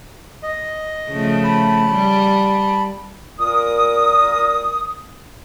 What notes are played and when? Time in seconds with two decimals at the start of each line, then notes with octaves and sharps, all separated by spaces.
0.43 D#5
1.10 C#3 F3 A3
1.44 A5 B5
1.90 G3
3.39 A#2 A#4 D#6